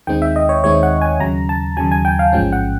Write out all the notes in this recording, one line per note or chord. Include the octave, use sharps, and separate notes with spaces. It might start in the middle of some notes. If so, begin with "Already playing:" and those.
D#2 D#3 G#3 C4 D#4 G5
E5
D#5
C#5
D#2 D#3 G#3 C4 D#4 C#5
F#5
G#5
D#2 C#3 F#3 A#5
A5
D#2 C#3 F#3 G#5
G#5
G5
F5
A1 G#2 F3 G#3 C#4 G5
F#5